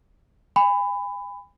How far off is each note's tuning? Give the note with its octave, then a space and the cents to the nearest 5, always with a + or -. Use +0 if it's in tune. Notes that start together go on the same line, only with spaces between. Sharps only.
G#5 -40 B5 +20